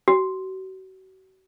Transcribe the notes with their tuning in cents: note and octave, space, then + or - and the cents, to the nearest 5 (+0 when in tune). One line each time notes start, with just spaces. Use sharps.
F#4 +35